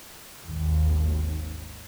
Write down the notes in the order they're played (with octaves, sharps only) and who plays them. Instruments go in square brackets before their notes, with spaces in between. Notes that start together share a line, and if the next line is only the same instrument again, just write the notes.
[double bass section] G#1 D#2